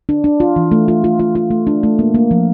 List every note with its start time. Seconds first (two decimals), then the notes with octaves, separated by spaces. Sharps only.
0.09 D4
0.24 D4
0.40 F4
0.56 E3
0.71 A3
0.88 F4
1.04 F4
1.19 F4
1.35 F4
1.51 A3
1.67 D4
1.83 A3
1.99 A#3
2.15 A#3
2.31 F3